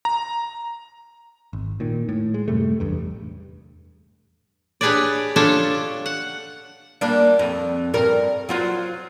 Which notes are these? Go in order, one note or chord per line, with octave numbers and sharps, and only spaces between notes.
A#5
G#1
A#2 D#3
A2
G#3
F#2 C3 G3 A3
A1 E2 G2
D4 G4 G#4 B4 C#5 D5
D4 F4 G4 A4 C#5
F#5
G3 A#3 D4
F2
G2 G3 A#4
F#3 F4 C5